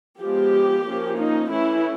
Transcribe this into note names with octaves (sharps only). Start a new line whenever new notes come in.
F3 G#3 B3 G4
F3 A#3 C#4
D#4
E3 A3 C#4 E4